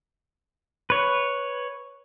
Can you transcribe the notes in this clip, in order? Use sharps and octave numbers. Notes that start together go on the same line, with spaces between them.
B4 C#5